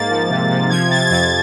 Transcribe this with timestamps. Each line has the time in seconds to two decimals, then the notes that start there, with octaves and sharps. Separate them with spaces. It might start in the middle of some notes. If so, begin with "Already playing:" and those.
Already playing: G#2 A#3 A6
0.10 F3
0.30 C3
0.51 C3
0.70 F3 G#6
0.91 C3 A6
1.02 A6
1.10 F2 G#6